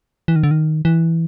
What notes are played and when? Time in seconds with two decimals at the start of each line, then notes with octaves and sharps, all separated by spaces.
0.28 E3
0.36 D#3
0.43 D3
0.51 D#3
0.85 E3